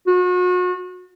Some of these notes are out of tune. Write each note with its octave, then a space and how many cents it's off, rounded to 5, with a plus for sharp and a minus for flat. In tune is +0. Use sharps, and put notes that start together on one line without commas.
F#4 -35